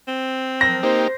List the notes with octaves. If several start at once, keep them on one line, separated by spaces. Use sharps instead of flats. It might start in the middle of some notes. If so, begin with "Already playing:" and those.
C4
F3 F#3 A#4 A#6
A#3 D#4 G4 C5